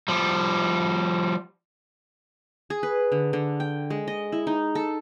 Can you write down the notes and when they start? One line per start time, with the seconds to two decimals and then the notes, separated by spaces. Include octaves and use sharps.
0.08 F3 G3
2.70 G#4
2.83 B4
3.12 D3
3.33 D3
3.60 G5
3.90 G#3
4.08 D#5
4.32 E4
4.47 D#4
4.75 A4